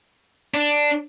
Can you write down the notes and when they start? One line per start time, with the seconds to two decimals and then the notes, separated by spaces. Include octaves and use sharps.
0.54 D4